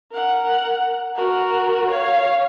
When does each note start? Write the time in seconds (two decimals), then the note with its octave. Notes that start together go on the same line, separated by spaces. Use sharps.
0.12 A#4 F#5
1.15 F#4 A#4
1.90 C#5 F5